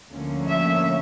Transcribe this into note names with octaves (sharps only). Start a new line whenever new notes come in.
D2 D3 F3 A#3 C#4
E5